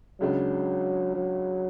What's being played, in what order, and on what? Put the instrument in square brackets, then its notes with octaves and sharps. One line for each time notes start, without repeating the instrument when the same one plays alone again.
[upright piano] C#2 C#3 G#3 D4 [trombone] F#3
[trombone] F#3